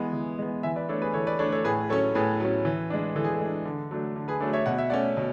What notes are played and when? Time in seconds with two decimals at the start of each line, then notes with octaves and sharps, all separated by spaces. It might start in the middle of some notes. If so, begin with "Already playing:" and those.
Already playing: E3 G#3 B3
0.13 E3
0.39 G#3 B3
0.63 E3 E5 G#5
0.76 B4 D5
0.89 A3 D4 A4 C#5
1.02 G#4 B4
1.14 E3 A4 C#5
1.27 B4 D5
1.39 D4 A4 C#5
1.42 A3
1.52 A4 C#5
1.64 A2 G#4 B4
1.89 F#3 C#4 A4 C#5
2.15 A2 G#4 B4
2.40 F#3 C#4
2.65 E3
2.90 G#3 D4
3.16 E3 A4
3.24 G#4
3.33 A4
3.41 G#3 D4
3.65 D3
3.91 F#3 A3 D4
4.16 D3
4.28 G#4 B4
4.41 F#3 A3 D4 A4 C#5
4.53 C#5 E5
4.66 B2 F#5
4.78 E5
4.90 A3 C#4 D5 F#5
5.17 B2